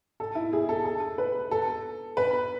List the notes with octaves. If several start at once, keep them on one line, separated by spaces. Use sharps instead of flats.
A4
E4
G#4
A4
A4
B4
A4
B4